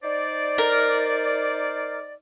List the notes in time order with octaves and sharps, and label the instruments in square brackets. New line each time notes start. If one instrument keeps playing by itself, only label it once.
[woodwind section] D#4 C5 D5
[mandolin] A#4